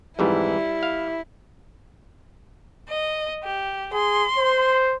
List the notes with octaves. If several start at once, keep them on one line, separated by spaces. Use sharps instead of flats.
F2 G#2 E3 G3 E4
F5
D#5
G4
G#4 C6
C5